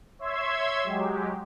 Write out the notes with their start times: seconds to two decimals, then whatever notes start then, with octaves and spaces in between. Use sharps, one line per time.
0.19 C#5 E5 C6 E6 G#6
0.84 F#3 G#3 G4